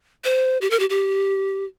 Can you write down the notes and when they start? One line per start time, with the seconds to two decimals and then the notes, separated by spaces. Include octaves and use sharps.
0.24 C5
0.61 G4
0.70 A#4
0.80 G4
0.90 G4